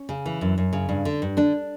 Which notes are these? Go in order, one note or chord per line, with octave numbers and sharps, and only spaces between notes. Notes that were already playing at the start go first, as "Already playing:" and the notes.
Already playing: C#4
C#3
E3
F#2
F#2
C#3
G2
D3
G2
D3 D4